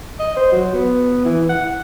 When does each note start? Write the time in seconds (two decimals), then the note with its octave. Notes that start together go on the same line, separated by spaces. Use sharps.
0.19 D#5
0.37 C5
0.52 F#3
0.74 B3
1.25 E3
1.49 F#5